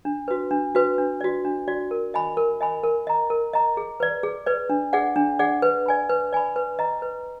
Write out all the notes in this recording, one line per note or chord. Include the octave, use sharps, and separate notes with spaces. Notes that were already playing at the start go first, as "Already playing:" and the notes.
D4
F#4 B4
D4
F#4 B4
D4
F#4 D5
D4
F#4 D5
A#4
D#5 G#5 B5
A#4
D#5 G#5 B5
A#4
D#5 A#5
A#4
D#5 A#5
G#4
B4 D5
G#4
B4 D5
D4
G#4 D5 F#5
D4
G#4 D5 F#5
B4
D5 G#5 B5
B4
D5 G#5 B5
B4
D#5 A#5
B4